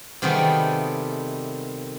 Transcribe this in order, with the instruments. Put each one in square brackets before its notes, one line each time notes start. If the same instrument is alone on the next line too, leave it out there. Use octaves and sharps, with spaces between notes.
[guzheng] C3 D#3 G3 A3 B3 G#4